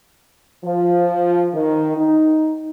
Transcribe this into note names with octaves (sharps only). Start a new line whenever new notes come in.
F3
D#3
D#4